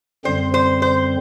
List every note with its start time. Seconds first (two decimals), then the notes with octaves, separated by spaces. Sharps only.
0.25 F#2 D3 G3 C4 C5
0.54 C5
0.82 C5